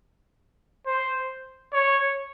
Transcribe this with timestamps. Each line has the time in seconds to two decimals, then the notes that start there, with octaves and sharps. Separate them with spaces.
0.86 C5
1.73 C#5